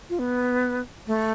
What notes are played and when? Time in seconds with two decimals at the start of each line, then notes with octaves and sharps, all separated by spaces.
0.10 F4
0.19 B3
1.07 A3